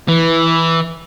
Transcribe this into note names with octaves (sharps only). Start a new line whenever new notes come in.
E3